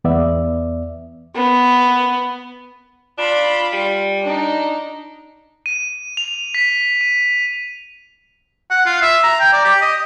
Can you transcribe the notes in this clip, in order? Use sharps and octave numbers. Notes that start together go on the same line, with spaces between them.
E2 B3 D5 E5
B3
D4 F4 B5
G3
D4 D#4
D#7
F7
B6
D#7
F#5
F4
E5
A#5
G5
D5
G4
D#5